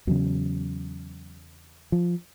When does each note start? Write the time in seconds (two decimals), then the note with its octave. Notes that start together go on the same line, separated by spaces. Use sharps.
0.07 E2 C#3 F#3
1.92 F3